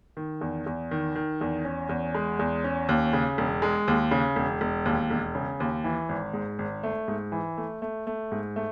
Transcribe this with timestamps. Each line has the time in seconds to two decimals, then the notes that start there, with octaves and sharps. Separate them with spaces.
0.17 D#3
0.41 E2
0.66 E2
0.91 D#3
1.16 D#3
1.41 E2
1.65 C#4
1.89 E2
2.15 G#3
2.39 E2
2.64 C#4
2.89 D#2
3.13 C#3
3.38 E1
3.62 G#3
3.88 D#2
4.11 C#3
4.36 E1
4.61 E1
4.85 D#2
5.10 E1
5.35 C#3
5.60 D#2
5.84 E3
6.09 G#1
6.34 G#2
6.59 G#1
6.83 A3
7.08 G#2
7.32 E3
7.57 A3
7.82 A3
8.07 A3
8.32 G#2
8.56 A3